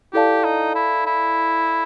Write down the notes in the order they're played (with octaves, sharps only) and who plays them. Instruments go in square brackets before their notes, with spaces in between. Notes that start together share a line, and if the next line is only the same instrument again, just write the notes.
[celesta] E4 A4 D5 F5 A5 [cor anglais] G4
[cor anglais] D#4
E4
E4